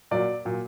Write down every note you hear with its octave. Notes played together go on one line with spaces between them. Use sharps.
A#2 F#3 D5
A#2 F#3